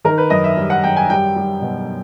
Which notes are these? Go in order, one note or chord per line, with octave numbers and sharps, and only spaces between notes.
D#3 A#4
B4
F#2 D#5
E5
G3
F#5
F#2 G5
G#5
G3 G5
G3
B2